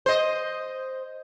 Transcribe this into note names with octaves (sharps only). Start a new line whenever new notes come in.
C5 D#5